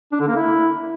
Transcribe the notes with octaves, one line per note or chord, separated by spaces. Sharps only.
D4
D3
A#3
E4